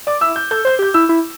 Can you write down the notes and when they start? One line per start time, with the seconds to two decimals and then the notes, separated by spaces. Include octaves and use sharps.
0.07 D5 D6
0.21 E4 E6
0.36 G6
0.51 A4 G6
0.65 C5 G6
0.79 G4 G6
0.94 E4 E6
1.09 E4